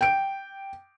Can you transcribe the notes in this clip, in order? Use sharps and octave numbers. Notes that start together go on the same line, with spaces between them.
G5 D7